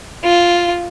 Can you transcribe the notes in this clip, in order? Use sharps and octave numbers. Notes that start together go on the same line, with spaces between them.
F4